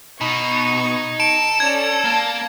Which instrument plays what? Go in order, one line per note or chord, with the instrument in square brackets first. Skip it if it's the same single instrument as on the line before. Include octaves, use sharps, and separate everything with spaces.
[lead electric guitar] B2 [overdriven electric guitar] D#4 [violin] C#6 G#6
[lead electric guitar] A4 [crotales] D7
[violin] C#4 D5 [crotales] G#6
[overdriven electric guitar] A#3 [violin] A5